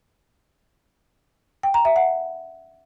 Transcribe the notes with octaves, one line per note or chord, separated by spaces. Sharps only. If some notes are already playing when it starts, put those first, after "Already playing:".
G5
A#5
E5
F#5